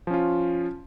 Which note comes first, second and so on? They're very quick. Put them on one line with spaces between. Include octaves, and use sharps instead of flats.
F3 C#4 F4